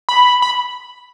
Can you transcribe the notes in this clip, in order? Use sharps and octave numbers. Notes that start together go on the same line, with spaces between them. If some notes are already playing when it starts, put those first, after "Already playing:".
B5
B5